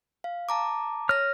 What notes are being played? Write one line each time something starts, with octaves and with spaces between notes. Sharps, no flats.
F5
A5 A#5 D6
C#5 F6 A#6